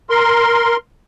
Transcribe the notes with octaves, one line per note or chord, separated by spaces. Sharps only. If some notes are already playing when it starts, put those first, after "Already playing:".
A#4 C6